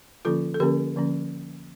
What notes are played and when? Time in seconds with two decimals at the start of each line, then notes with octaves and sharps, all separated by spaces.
0.25 D3 F3 A#3 C#4 F4 A4
0.54 A4
0.60 D3 F3 A#3 C#4 G4 A#4
0.96 D3 F3 A#3 C#4